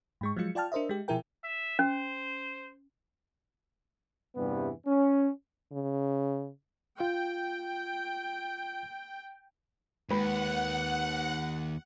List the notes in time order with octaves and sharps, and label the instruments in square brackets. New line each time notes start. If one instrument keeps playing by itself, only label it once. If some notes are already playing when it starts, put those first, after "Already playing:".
[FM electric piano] G#2 G#3 C#6
F3 F#3 G#3 F4 C#7
F4 D5 G5 A5 F6
D4 A#4 C5 D#5 E5
G#3 G4
B2 F3 E4 G#4 A#4 G5
[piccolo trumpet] E5
[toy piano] C#4 [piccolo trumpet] C5
[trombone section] E2 G2 C3 E3 G3 B3
C#4
[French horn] C#3
[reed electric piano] F4 [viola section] G5
[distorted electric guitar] D#2 [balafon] G#3 B5 [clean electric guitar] B4 [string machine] F#5